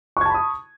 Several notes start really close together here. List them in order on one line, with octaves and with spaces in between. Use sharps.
C#6 G#6 A5 B5 D#6